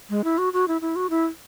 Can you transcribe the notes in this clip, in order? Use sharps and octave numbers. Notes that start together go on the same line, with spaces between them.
G#3
E4
F#4
F#4
E4
E4
F#4
E4